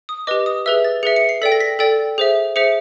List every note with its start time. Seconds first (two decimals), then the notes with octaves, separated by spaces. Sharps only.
0.09 D#6
0.27 G4 B4 D#5 D6
0.46 D#6
0.66 G#4 B4 E5 E6
0.84 A6
1.03 G#4 B4 E5 C#7
1.16 C#7
1.29 C7
1.42 A4 D5 G5 B6
1.52 A#6
1.60 B6
1.79 A4 D5 G5 A6
2.18 G#4 C5 E5
2.56 G#4 C5 E5 C#7